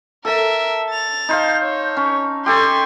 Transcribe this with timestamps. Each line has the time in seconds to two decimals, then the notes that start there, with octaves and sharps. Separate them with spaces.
0.25 A4 A#4 E5 A5
0.90 A6 F7
1.29 D#4 C5 F5
1.61 C#5
1.97 C#4
2.46 G4 A4 G#5 C6 C#6